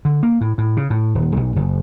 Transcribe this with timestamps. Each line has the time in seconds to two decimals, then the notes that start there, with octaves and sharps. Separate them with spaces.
0.05 D3
0.23 A#3
0.41 A2
0.58 A2
0.77 C#3
0.90 A2
1.15 D#1
1.37 B1
1.56 F#1